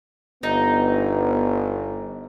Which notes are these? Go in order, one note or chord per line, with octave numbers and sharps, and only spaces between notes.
G1 B3 D#4